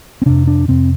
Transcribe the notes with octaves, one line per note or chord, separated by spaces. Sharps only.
C4
F2 C3 D4
D4
F2 C3 C4